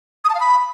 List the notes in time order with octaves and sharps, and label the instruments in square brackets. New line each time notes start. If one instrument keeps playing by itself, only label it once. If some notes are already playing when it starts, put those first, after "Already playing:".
[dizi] D#6
A5
F5
B5